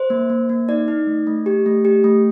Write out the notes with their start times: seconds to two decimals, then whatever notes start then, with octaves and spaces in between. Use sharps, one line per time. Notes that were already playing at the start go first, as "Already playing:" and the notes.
Already playing: C5
0.10 A#3
0.30 A#3
0.49 A#3
0.68 D#4 D5
0.88 D#4
1.07 A3
1.27 A3
1.46 G4
1.66 A3
1.85 G4
2.04 A3